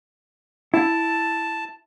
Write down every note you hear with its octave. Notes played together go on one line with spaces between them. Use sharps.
E4 A5